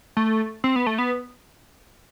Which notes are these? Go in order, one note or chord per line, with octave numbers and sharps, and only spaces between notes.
A3
C4
B3
A3
B3